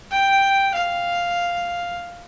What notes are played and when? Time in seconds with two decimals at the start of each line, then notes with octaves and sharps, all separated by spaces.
0.11 G5
0.74 F5